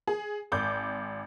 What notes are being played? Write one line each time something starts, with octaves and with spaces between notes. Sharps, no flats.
G#4
G#1 D6 G6